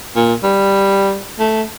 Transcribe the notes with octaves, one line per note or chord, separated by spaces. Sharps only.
A#2
G3
A3